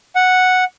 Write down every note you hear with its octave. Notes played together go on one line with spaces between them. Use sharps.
F#5